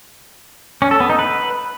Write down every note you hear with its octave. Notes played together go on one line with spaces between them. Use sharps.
C#4
A4
B3
D#4
B4